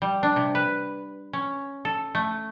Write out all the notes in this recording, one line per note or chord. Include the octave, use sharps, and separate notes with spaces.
G3
D4
C3
B4
C#4
A4
A3